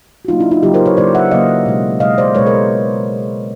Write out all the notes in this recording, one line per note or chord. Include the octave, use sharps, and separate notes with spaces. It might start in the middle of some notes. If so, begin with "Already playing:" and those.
F#4
C#3 F#3 A#3 D#4 F4
D4 E4
D#4 F4
C#3 F#3 A#3 F4 G4
A#4 C5
B4 C#5
C#3 F#3 A#3 C5 D5
E5 F#5
C#3 F#3 A#3 D#5 F5
B2 G#3
B2 G#3 D#5 F5
C5 D5
B2 G#3 B4 C#5
A#4 C5